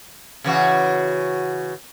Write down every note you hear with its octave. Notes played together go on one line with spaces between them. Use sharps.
C#3 E3 F#4